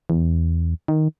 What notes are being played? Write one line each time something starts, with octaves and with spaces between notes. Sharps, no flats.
E2
D#3